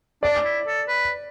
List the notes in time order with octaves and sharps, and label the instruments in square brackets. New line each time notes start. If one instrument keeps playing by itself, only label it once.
[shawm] D4 [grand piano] D5
[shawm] E4
A4
B4